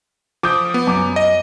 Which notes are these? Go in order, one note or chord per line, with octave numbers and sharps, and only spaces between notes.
F3 D6 D#6 G6
B3
F#2 D6
D#5